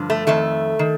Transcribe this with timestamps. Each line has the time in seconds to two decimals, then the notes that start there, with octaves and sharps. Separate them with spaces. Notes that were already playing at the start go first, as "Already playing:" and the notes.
Already playing: G2 D3 F3
0.10 A3
0.27 F2 D#3 A3
0.79 D#3